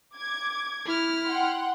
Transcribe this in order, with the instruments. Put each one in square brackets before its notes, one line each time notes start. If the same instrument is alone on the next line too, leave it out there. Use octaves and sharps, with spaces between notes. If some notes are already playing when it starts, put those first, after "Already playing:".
[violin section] D6 G#6
[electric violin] E4 F6
[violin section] F#5 G5 C6